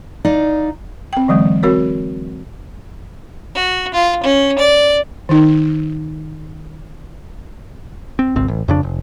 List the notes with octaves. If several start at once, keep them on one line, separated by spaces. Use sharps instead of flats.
D#4 D5 F5
C4 G5
D3 E3 F#3 G#3
C4 F#4 A#4 C#5
F#4
F4
C#4
D5
D#3 D#4
C4
G#1 C#2 C4
A1
F2 C#3 D4
F1